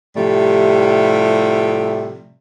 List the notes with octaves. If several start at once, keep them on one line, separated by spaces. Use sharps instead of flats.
A2 C3 F3 G3 A3